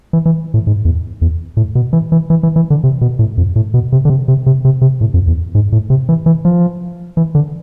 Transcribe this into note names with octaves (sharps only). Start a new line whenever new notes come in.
E3
E3
A2
G#2
E2
E2
A2
B2
E3
E3
E3
E3
E3
D3
C3
B2
A2
F2
A2
B2
C3
D3
C3
C3
C3
C3
C3
A2
F2
E2
G#2
A2
C3
E3
E3
F3
E3
D3